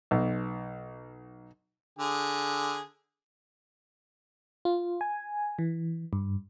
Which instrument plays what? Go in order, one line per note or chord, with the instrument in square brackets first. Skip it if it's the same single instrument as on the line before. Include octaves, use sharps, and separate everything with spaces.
[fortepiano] B1
[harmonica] D3 G#4
[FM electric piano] F4
G#5
E3
G2